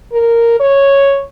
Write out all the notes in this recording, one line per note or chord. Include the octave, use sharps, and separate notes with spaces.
A#4
C#5